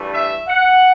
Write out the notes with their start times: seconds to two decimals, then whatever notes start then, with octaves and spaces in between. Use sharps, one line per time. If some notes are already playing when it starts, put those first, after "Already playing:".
Already playing: G2 E3 A3
0.13 E5
0.48 F#5